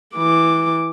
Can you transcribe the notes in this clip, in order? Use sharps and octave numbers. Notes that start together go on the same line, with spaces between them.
E3 D6